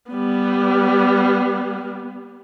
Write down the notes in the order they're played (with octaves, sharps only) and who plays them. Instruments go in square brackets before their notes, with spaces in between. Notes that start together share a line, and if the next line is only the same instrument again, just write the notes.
[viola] G3 B3